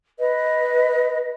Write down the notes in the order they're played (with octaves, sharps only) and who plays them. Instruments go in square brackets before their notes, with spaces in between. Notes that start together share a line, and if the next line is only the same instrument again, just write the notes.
[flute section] B4 D#5